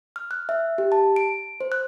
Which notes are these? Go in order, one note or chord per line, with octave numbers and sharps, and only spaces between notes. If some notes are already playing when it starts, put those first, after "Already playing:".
F6
F#6
E5
G4
A5
D7
C5
F#6